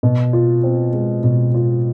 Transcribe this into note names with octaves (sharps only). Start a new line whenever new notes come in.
B2
F4
C4
G#3
B2
F4